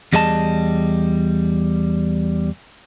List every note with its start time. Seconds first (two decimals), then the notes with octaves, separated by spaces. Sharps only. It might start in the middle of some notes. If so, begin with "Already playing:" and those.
0.13 E2 G3 G#4 D#5 A5